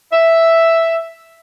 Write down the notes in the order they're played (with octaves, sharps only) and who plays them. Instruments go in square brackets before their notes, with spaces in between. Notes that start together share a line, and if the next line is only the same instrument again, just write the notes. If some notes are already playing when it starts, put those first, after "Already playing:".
[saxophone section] E5